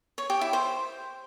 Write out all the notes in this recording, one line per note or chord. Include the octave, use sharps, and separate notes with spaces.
C#5
G4
E4
C5